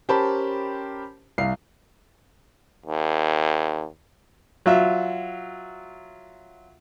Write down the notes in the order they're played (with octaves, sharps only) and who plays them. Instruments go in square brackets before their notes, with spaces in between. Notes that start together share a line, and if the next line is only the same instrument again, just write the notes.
[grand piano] C#4 G4 A#4 C5 A5 B5
C2 F5 C7
[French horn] D#2
[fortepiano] F#3 F4 E5